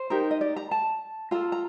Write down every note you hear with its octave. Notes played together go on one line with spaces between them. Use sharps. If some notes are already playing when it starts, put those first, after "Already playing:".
Already playing: C5
D#4 G4 A#4
D#5
D5
A#5
A5
F4 A4 A#5
A#5